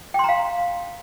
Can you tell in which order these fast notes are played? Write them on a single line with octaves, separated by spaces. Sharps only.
G5 C6 A#5 F5